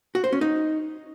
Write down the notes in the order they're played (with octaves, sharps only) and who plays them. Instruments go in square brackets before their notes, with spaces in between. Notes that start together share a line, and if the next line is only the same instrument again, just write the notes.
[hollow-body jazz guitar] F#4
C5
C#4
D#4